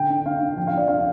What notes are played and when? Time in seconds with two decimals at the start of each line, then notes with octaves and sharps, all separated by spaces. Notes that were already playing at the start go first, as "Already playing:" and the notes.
Already playing: D3 G5
0.09 D4
0.25 D4 F5
0.41 D4
0.57 F3 G5
0.67 F5
0.73 D4 D5
0.88 D4 F5